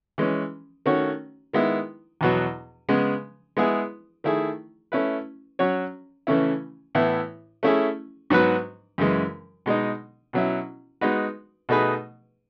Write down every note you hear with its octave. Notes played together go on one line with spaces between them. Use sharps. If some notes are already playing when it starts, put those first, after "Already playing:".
E3 G#3 C#4
D#3 A3 C#4 F#4 C#5
D#3 G#3 B3 E4
E2 B2 F#3
C#3 G#3 B3
G#3 B3 E4 G#4
D#3 A3 E4 G#4
A3 C#4 E4 B4
F#3 C#4 F#4 C#5
C#3 E3 A3 C#4 E4
A2 E3 B3 E4
A3 C#4 E4 G#4
G#2 F#3 B3 F#4 B4
F#2 C#3 E3 G#3
B2 G#3 D#4
B2 F#3 C#4 E4
G#3 B3 D#4 F#4 B4
B2 A3 D#4 G#4 B4